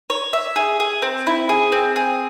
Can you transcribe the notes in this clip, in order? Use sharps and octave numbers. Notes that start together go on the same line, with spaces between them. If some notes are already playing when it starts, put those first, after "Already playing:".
C#5
E5
G#4
G#4
C4
E4
G#4
C4
G#4